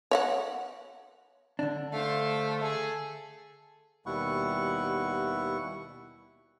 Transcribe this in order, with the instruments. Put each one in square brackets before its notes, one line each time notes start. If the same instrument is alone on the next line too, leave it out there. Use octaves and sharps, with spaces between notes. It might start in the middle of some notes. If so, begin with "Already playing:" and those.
[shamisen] C#5 E5 F#5
[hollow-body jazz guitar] D3 D4
[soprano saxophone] A3 [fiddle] C5 F5
[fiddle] G#4 [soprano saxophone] A4
[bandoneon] D#2 B2 G3 E4 F#5 C#6